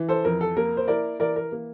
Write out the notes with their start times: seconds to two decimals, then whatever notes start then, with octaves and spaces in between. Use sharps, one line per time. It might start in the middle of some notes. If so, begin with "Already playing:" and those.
Already playing: E3
0.08 A4 C5
0.25 F2 A#4
0.41 A4
0.57 A#3 A#4
0.77 C5
0.88 E4 A#4 D5
1.20 E3 A#4 D5
1.36 A#4
1.52 A#3